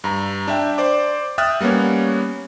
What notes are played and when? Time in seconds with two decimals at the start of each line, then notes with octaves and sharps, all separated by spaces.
0.04 G2 A#5
0.48 D4 E5 G5
0.78 C5 D5 D6
1.38 E5 G5 D#6 F6 F#6 A6
1.61 G3 A#3 B3 C#4 C#5